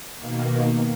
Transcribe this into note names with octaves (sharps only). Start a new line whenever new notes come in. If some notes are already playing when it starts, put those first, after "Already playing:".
B2 D#3 A#3